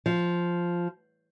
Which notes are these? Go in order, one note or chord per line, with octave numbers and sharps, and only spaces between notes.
F3